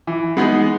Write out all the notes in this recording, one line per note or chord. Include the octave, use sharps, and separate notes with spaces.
E3
G#3 B3 D#4 G#4